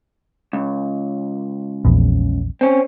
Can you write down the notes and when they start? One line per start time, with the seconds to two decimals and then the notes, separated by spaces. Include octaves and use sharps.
0.53 C#2
1.85 A#1 E2
2.61 C4 C#4